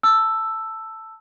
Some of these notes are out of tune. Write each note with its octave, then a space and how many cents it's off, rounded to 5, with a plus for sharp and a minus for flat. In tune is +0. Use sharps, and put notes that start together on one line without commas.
A5 +10 E6 +5